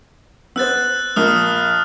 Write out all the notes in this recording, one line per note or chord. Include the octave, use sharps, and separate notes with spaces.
B3 C5 E6 F#6 A6
A#1 A#3 D#6 F6